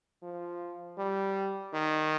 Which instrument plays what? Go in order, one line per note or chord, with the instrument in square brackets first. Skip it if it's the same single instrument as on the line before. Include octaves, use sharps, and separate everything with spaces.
[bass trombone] F3
G3
D#3